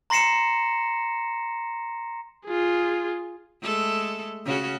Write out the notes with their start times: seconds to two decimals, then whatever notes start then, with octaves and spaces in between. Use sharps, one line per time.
0.10 A#5 C6 A#6 C7 C#7 E7
2.47 F4 G#4
3.62 G#3 A3 A4
4.45 C#3 C#4 F#4